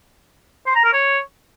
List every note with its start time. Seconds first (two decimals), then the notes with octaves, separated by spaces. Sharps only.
0.67 C5
0.76 A#5
0.85 A#4
0.94 C#5